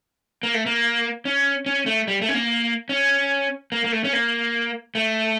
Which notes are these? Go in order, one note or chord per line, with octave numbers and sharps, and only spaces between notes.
A#3
A3
A#3
C#4
C#4
A3
G3
A3
C#4
A#3
C#4
A#3
A#3
A3
C#4
A#3
A3